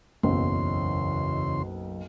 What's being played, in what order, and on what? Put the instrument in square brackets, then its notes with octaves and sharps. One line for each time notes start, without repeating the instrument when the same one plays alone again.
[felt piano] F#1 B1 [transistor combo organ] E2 C#3 C6